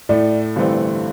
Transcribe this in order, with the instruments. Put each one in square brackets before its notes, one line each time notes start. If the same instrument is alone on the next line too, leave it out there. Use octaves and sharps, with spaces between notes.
[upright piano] A2 A3 E4 [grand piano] D5
[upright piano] G1 G2 E3 A3 C4